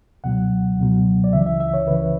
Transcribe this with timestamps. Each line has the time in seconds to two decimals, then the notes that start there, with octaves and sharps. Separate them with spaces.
0.24 C#2 B2 F#3 F#5
0.78 C#2 B2 F#3
1.24 D5
1.33 C#2 C#3 E3 E5
1.47 E5
1.60 E5
1.74 C#5
1.87 C#2 C#3 E3 B4